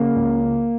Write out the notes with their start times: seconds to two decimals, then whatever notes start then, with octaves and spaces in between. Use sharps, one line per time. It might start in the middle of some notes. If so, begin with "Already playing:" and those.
Already playing: C#3 A#3
0.15 C#2